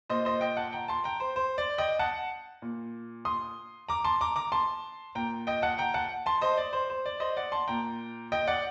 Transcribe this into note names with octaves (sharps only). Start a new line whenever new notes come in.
A#2 C5 D#5
C5 D#5
D#5 G5
F#5 A5
G5 A#5
A5 C6
G5 A#5
C5
C5
D5
D#5 G5
F#5 A5
A#2
C6 D#6
A#5 D6
A5 C6
A#5 D6
A#5 D6
A5 C6
A#2 G5 A#5
D#5 G5
F#5 A5
G5 A#5
F#5 A5
A5 C6
C5 D#5
D5
C5
C5
D5
C5 D#5
D5 F#5
A5 C6
A#2 G5 A#5
D#5 G5
D5 F#5